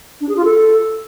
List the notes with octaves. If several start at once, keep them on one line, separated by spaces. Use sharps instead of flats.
D4
G#4
F4
A4